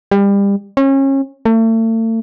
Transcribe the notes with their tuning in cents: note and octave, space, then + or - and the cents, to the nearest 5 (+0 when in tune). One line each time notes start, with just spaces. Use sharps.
G3 +30
C#4 -30
A3 +40